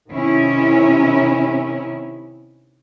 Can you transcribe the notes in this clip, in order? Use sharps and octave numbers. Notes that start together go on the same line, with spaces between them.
C3 D#3 C#4 E4